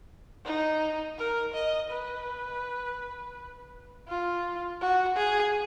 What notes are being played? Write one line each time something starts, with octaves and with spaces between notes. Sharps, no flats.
D#4
A#4
D#5
B4
F4
F#4
G#4